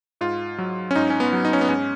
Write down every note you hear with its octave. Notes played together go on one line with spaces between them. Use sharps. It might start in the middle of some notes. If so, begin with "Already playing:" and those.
G#2 F4
F#3
C#4
G#2 D#4
C#4
B3
F#3
D#4
C#4
B3
G#2 C#4